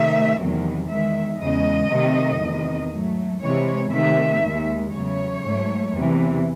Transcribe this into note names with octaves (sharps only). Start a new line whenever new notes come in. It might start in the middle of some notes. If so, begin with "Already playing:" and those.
Already playing: C3 D#3 A3 E5
E2 C3 D#3 F#3
E2 D#3 G#3 E5
E2 C#3 G#3 D#5
C3 D#3 F#3 A3
E2 C3 D#3
G#2 F#3 A3
C3 E3 G#3 C#5
C3 D#3 A3 E5
D#2 D#3 G#3
E2 C#3 F#3 A3 C#5
G#2 F#3 A3
E2 C3 E3